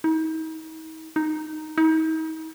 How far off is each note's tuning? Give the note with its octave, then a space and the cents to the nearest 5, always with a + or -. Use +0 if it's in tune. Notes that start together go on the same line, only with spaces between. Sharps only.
D#4 +40
D#4 -5
D#4 +40